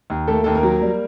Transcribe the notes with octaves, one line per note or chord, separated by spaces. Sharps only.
D#2
A3 A#3 A4
D#2 A4
A#3 A#4
F#3
G3